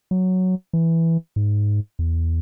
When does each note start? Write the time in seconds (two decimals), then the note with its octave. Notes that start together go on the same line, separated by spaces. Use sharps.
0.11 F#3
0.73 E3
1.36 G#2
1.99 E2